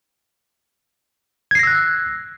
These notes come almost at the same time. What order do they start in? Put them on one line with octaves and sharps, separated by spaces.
G#6 C7 A#6 E6 F#6